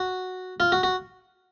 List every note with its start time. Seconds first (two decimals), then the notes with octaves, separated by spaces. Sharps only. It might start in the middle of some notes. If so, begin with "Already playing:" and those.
Already playing: F#4
0.60 F4
0.72 F#4
0.83 F#4